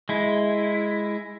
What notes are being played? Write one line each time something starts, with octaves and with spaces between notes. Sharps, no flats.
G#3 E4